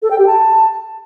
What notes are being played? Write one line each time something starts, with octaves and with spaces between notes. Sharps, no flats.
A4
G5
G4
A5